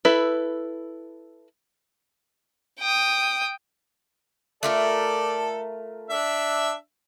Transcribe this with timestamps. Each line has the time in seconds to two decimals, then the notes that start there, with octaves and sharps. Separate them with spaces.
0.05 E4 A4 B4
2.79 G5 D#6
4.63 A3 F4 A4 A#4 D5
6.10 D4 E5